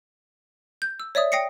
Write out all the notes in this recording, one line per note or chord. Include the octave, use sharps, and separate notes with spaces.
G6
E6
C#5 D5 E5 D#6
G5 D#6 A#6 C7 C#7